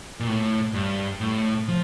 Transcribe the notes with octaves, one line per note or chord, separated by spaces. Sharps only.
A#2
A2
G2
A2
F3